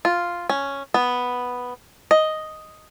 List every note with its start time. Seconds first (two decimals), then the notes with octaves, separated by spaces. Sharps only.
0.05 F4
0.49 C#4
0.94 B3
2.11 D#5